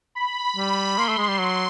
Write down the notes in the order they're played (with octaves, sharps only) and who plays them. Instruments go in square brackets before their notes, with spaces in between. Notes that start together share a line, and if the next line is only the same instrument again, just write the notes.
[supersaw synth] B5
[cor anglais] G3
[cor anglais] A#3 [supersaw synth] C6
[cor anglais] A3
G#3
G3
[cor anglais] F#3 [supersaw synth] C6